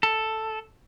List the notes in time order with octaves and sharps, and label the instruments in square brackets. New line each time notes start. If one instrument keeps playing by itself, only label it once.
[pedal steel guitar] A4